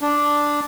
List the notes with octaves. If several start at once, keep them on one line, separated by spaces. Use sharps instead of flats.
D4